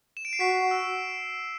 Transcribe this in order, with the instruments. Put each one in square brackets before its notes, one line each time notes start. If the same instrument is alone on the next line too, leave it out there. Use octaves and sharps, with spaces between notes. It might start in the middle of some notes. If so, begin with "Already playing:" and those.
[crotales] E7
D7
C7
[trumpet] F#4 [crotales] B6
[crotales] E6